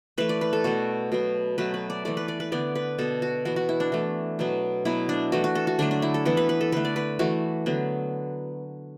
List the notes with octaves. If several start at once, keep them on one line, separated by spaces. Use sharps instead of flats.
E3 A3 B4
D5
B4
A4
B2 A3 F#4
B2 F#3 B3
B2 F#3 A3 B4
B4
D5
E3 A3 D5
B4
D5
B4
D3 B3 D5
B4
B2 B3 A4
F#4
E3 B3 F#4
F#4
E4
D4
E3 A3
B2 F#3 B3
B2 F#3 B3 E4
D4
E3 A3 F#4
F#4
A4
F#4
D3 F#3 A3 D4
D4
E4
A4
E3 B3 A4
B4
B4
A4
D3 A3 B4
D5
B4
E3 A3 F#4
D3 F#3 B3